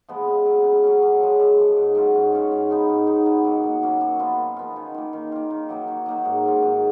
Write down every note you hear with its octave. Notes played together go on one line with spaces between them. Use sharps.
F3 G#3 B3
C#3
F#3 C#4
C#3
F#3 C#4
F#2
F3 G#3
F#2
F3 G#3
G#2
F#3 C#4 F4
G#2
F#3 C#4 F4
G#2
F3 B3 D#4
G#2
F3 B3 D#4
B2
F#3 A#3 C#4
B2
F#3 A#3 C#4
F#2
F3 B3 F4
F#2
F3 B3 F4
D#3
A#3 F4
D#3
A#3 F4
D#3
F#3 A#3 D#4
D#3
F#3 A#3 D#4
G#2
F#3 C#4 F4
G#2